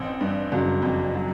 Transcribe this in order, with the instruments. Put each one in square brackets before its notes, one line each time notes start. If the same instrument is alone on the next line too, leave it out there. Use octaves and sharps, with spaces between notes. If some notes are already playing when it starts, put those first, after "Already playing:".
Already playing: [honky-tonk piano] A1 [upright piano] C4
[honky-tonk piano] G2
[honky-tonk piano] F#1 [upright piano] F#3
[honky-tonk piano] F2
[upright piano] F#3